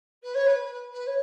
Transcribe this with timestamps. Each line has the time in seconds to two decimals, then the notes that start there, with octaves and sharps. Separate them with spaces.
0.23 B4
0.34 C#5
0.46 B4
0.64 B4
0.92 B4
1.06 C#5